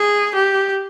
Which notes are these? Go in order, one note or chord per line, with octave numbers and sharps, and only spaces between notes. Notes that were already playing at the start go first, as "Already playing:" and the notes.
Already playing: G#4
G4